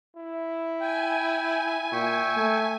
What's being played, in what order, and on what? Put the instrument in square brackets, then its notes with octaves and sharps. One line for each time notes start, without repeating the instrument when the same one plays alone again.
[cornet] E4
[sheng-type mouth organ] G5 [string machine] G#5
[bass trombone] A#2 [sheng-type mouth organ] E5 G5 C#6
[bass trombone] A3